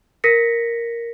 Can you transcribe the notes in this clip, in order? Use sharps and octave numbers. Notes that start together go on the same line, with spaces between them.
A#4 A#6 B6 C#7